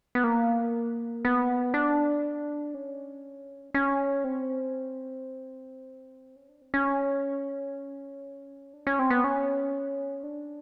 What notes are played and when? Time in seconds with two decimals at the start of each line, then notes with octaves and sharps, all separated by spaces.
0.15 B3
0.24 A#3
1.25 B3
1.74 D4
2.74 C#4
3.74 C#4
4.24 C4
6.36 C#4
6.49 D4
6.62 C4
6.74 C#4
8.74 D4
8.87 C#4
8.99 C4
9.10 B3
9.24 C#4
10.23 D4